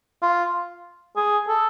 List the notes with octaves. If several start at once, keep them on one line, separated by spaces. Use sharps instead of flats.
F4
G#4
A4